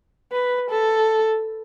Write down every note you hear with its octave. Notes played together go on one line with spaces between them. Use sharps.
B4
A4